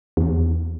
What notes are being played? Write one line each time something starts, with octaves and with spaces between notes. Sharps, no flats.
E2